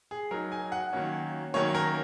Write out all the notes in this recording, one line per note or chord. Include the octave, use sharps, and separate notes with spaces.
G#4
F#3 D#4 A#4
G#5
F#5
D#3 F#3 A#3 C#4
D#3 F#3 A#3 C#4 C#5
A#4